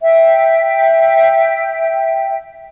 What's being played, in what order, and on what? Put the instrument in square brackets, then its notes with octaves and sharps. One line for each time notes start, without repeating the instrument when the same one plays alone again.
[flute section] E5 G5